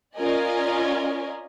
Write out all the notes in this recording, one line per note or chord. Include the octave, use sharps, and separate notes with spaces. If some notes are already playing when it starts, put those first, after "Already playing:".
C#4 F4 A#4 D5 D#5 G#5